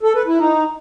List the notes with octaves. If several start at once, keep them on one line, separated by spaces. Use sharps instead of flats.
A4
B4
E4
D#4